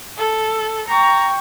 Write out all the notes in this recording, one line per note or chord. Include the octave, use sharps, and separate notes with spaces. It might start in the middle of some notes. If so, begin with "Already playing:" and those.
A4
G5 A#5 C#6